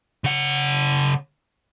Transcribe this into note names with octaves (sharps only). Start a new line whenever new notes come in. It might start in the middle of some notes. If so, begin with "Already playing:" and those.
C#3 F#5